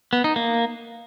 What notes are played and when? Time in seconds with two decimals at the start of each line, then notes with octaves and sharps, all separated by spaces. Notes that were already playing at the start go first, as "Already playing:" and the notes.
0.13 B3
0.24 D#4
0.36 A#3